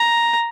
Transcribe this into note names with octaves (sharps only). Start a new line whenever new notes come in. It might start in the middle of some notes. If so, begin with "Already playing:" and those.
Already playing: A#5